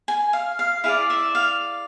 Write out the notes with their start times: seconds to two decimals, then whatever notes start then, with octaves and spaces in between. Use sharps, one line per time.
0.08 G#5
0.33 F5
0.59 F5
0.84 E4 G#4 D5 F5
1.10 E5
1.35 F5